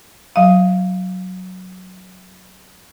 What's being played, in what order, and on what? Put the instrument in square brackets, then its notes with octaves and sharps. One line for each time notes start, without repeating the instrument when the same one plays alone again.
[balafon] F#3 F5